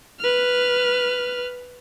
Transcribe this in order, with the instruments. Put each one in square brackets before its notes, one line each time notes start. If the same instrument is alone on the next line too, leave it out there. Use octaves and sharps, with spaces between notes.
[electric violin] B4 F6